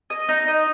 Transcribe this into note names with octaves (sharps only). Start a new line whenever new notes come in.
D#5
D#4
D#5